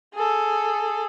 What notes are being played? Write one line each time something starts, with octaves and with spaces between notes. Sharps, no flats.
G#4 A4